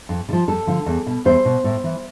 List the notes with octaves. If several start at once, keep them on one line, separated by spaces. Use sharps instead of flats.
F2
D3
F3
F2 A4
D3 F3
E2
B2
E2 C5
B2
A2
E3